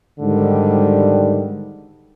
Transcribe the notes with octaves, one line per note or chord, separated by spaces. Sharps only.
G#2 D3 D#3 G3